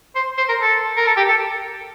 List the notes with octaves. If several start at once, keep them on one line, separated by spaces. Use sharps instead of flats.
C5
C5
A#4
A4
A#4
A4
G4
A4